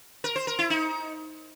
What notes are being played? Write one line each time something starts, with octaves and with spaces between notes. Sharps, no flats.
A#4
C5
A#4
E4
D#4